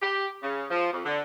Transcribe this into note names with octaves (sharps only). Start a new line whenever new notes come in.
G4
C#3
F3
F2
D3